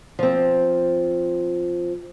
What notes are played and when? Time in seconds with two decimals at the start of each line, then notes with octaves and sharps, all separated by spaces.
0.19 F3 C4